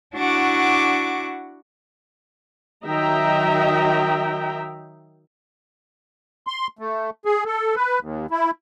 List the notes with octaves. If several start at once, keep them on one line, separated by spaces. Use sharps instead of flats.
D4 E4 F#4 F#5 C#6 D6
D#3 F#3 D#5 E5 G5 A#5
C6
A3
G#4
A4
B4
D#2
E4